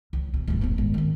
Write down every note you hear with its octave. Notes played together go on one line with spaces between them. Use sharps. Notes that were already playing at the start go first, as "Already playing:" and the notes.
C#2
B2
D1 G2
D#1 B3
G#1
D#3 C4